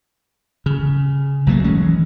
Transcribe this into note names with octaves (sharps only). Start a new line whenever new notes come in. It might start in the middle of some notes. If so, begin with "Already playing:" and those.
C#3
B1 F#3 A3 A#3
D#3 E3 G#3 C#4